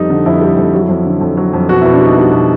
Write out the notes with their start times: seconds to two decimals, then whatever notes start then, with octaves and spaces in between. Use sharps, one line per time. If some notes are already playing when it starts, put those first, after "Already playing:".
Already playing: F2 G3 D#4
0.10 D3
0.26 F2 E4
0.41 G3
0.57 F2
0.73 F#3
0.89 F2
1.06 D3
1.21 F2
1.37 F#3
1.53 F2
1.69 B2 F#4
1.81 E4
1.85 B2
1.93 D4
2.01 G3 D#4
2.17 G3 D#4
2.33 B2